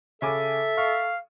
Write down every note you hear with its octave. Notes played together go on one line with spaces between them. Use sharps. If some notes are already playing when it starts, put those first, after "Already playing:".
C#3 A4 E5 G#5 D6
F5 C#6